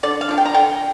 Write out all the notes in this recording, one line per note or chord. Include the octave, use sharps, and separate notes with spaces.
D3 D5
F5
F3 D4
G5
A#5
D3 G5